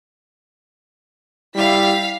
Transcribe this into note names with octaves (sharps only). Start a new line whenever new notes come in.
G3 E4 F5 B6